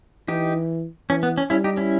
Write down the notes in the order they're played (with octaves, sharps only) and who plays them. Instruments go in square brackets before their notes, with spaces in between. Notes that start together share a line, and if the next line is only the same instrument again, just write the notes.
[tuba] E3 [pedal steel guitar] D#4 G4
[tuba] E3 [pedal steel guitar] C#4
[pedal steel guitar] B3
C#4
[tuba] G3 [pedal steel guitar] C#4 E4
[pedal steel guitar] D#4 G4
C#4 E4